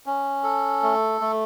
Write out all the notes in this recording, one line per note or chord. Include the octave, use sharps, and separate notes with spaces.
C#4
A4
A3
A3